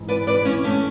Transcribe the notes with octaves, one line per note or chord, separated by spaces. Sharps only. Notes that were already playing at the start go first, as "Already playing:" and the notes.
Already playing: G#2 E3
B4 D5
B4 D5
C#4 E4
A3 C#4